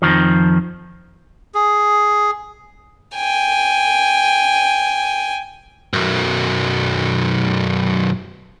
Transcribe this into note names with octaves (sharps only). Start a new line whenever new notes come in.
F2 A#2 D#3 F3
G#4
G5 G#5
B1 F#2